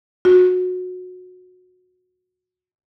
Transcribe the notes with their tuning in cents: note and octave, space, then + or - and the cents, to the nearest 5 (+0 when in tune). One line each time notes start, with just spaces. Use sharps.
F#4 -20